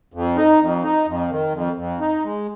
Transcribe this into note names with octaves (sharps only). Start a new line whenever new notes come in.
F2
D#4
F2
D#4
F2
D#3
F2
F2
D#4
G#3